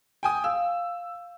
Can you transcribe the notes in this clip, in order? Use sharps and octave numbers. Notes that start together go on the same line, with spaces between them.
G5 G#5 D#6
F5 E6